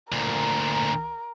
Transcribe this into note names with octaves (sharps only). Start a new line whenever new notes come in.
D2 A#2 A#4